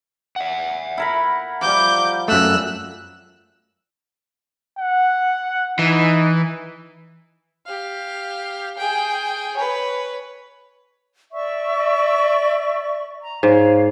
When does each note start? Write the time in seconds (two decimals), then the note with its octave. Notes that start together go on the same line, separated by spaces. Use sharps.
0.36 E5 F#5
0.98 E4 A#4 B5
1.61 F3 G3 D6 G6
2.28 F#2 A3 E6 F#6
4.79 F#5
5.79 E3 D#4
7.66 G4 F5
8.78 G#4 G5
9.57 B4 C#5
11.32 D5 E5 C#6
13.19 A#5
13.43 G#2 C#5 F5